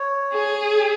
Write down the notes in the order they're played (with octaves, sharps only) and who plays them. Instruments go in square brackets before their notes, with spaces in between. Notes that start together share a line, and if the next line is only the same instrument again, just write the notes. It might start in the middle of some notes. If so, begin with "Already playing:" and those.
Already playing: [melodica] C#5
[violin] G#4